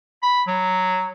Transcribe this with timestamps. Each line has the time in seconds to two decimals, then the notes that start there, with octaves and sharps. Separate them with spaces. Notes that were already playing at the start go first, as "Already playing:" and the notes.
0.22 B5
0.47 F#3